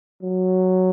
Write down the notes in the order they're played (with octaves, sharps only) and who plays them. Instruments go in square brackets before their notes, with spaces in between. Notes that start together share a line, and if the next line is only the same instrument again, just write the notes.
[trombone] F#3